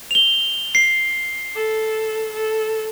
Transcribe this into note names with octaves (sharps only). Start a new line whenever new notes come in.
F7 G7
C7
A4
A4